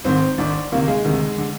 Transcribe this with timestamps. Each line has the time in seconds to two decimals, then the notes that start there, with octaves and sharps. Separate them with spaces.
0.04 G#1 G#2 D#3 C4
0.38 G#1 G#2 D#3 D4
0.72 D2 C3 D#3 A#3
0.88 G#3
1.05 D2 C3 D#3
1.38 D3